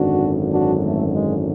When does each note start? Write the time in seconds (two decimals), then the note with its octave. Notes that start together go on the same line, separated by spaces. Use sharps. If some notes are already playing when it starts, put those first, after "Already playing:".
Already playing: G#1 F#2 D3 F#3 D4 F#4
0.50 D4 F#4
0.82 A3
1.13 G#3